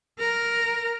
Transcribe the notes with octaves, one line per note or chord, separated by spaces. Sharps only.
A#4